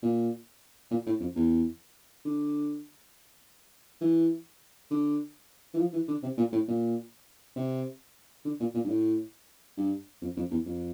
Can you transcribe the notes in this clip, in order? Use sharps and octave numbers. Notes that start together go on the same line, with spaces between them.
A#2
A#2
A2
F2
E2
D3
E3
D3
E3
F3
E3
D3
C3
A#2
A2
A#2
C3
D3
A#2
A#2
G2
A2
G2
F2
F2
E2
F2